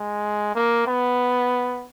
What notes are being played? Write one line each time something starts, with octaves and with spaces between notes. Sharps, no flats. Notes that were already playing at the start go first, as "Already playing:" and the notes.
Already playing: G#3
A#3
B3